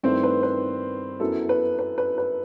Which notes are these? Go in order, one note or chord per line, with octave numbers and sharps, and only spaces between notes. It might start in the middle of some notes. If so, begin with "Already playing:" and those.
G2 D#3 A3 C4 E4 C5
B4
B4
F#2 F#3 B3 E4 A4
B4
B4
B4
B4